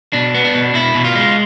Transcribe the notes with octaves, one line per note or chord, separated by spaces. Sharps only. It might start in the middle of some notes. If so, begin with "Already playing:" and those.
B2 D4
B3
D4
B2
B2 E4
B2
F4
G#3